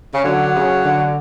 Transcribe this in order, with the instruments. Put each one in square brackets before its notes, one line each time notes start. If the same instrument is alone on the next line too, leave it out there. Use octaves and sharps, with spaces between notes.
[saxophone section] C#3
[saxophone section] D3 [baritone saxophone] F#3
[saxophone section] C#3
D3